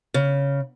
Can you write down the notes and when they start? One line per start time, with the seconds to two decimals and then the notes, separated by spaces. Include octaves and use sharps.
0.14 C#3